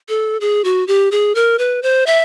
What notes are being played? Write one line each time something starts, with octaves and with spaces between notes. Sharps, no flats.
A4
G#4
F#4
G4
G#4
A#4
B4
C5
E5